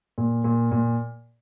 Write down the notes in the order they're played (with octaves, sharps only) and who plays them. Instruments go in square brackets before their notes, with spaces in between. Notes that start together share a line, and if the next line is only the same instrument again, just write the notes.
[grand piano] A#2
A#2
A#2